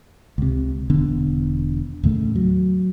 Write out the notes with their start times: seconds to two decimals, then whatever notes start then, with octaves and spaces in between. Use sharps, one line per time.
0.38 C#2 C3
0.90 E1 D3 B3
2.03 D#2 A2 C#3 A3
2.36 F#3